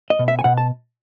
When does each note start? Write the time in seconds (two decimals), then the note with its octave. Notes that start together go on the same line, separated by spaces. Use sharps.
0.10 D#5
0.19 B2
0.28 E5
0.39 G#5
0.44 B2 F#5
0.57 A5